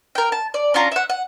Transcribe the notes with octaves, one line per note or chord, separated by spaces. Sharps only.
A#4 G5
A5
D5
C#4 D4 F4 A#5
E5 F#5
F#5